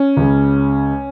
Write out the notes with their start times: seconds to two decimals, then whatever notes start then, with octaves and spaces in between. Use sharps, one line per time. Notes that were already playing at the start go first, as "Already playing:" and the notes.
Already playing: C#4
0.17 C#2 C#3